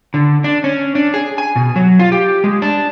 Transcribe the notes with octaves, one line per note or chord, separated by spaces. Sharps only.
D3
D4
C#4
D4
G#4
G#5
B2
F#3
F4
G4
G#3
D4